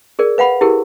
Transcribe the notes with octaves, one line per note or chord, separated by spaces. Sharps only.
G#4 A#4 D5
B4 F5 F#5 B5
E4 G4 G#4 A#4